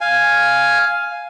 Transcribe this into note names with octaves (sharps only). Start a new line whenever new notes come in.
F5 G#5